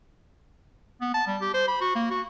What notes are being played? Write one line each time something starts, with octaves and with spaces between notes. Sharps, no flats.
B3
A5
G3
G4
C5
B5
F#4
A#3
F#4